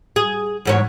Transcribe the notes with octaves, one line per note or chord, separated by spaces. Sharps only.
G#4
E2 G#2 C#5